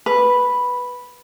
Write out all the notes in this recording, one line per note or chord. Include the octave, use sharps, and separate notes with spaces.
B4